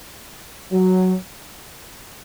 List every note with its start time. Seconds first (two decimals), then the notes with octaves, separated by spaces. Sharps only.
0.72 F#3